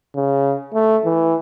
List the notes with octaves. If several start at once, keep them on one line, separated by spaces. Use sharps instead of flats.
C#3
A3
E3